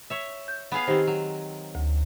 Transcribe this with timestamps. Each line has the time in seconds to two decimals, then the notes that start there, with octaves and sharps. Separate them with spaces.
0.10 C#5 E5
0.48 G6
0.72 B3 G#4 F5
0.87 D#3 C4 G4 C5
1.07 F#3
1.75 D2